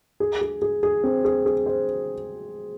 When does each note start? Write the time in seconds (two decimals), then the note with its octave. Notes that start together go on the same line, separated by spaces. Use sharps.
0.20 G#4
0.41 G#4
0.62 G#4
0.83 G#4
1.04 C4
1.25 G#4
1.46 G#4
1.66 C5